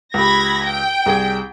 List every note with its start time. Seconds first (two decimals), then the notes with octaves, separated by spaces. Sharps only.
0.14 C#2 G4 B5 G#6 A#6
0.65 G5
1.06 C2 G#4 G#6